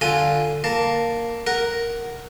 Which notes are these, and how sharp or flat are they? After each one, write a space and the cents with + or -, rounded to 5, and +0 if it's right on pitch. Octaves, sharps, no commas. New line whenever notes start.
D3 +10 F4 +0 G#5 +0
A#3 +0 A5 +10
A#4 +0 F#5 +0